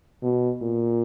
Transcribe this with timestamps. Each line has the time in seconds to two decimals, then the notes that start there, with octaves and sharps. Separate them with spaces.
0.23 B2
0.62 A#2